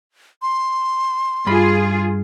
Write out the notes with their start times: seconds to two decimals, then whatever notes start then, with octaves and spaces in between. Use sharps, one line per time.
0.42 C6
1.47 G2 F4 G#4 B5